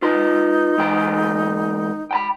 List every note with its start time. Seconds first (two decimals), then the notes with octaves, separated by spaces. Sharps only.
0.02 D#4 F4 B4 C6
0.78 G#2 E3 G5
2.11 G5 A5 B5